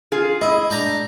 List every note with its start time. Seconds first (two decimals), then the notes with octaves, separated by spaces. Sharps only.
0.12 F4 G#4
0.41 E4 D#5
0.70 D4 G5 A#5